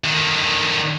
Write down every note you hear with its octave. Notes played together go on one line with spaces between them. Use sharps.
D3 D#3